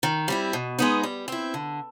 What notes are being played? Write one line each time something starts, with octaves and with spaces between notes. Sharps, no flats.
D#3
G3 C4 E4
B2
G#3 B3 D#4
G3
C4 E4
D3